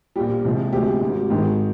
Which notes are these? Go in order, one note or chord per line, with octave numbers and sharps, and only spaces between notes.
A#1 A#2 G3 G4
C2 C3 F3 G#3
D2 C3 F3 G#3 G4
G#1 G#2 G3
G#1 G#2 D#3 G#3